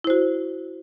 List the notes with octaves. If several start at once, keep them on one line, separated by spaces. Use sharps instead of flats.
E4 F#4 C5